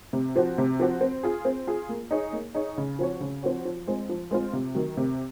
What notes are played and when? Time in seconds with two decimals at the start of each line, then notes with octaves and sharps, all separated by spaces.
0.13 C3
0.36 F3 C4 F#4
0.58 C3
0.80 F3 C4 F#4
1.01 C4
1.23 F4 G#4
1.45 C4
1.67 F4 G#4
1.89 A#3
2.11 D#4 G#4 C#5
2.33 A#3
2.55 D#4 G#4 C#5
2.78 C#3
2.99 F3 C4 F#4 C#5
3.21 C#3
3.43 F3 C4 F#4 C#5
3.65 F3
3.87 G#3 C4 F4
4.09 F3
4.31 G#3 C4 F4
4.53 C3
4.75 D#3 F#3
4.97 C3